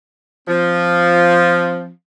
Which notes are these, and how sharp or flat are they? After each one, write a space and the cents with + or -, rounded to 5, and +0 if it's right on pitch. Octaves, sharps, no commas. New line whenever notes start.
F3 +0 C4 +0